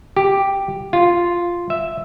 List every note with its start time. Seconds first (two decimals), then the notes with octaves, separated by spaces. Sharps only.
0.16 G4
0.93 F4
1.70 E5